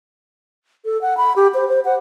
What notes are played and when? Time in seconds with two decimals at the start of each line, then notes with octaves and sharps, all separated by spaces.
0.85 A4
1.02 F#5
1.17 B5
1.36 G4
1.54 C5
1.69 C5
1.85 F#5